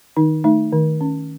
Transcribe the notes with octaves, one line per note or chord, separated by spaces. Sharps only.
D#3 D#4
A3 D#4
D#3
C#4